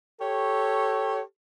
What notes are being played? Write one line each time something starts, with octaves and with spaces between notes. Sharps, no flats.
G4 A4 C#5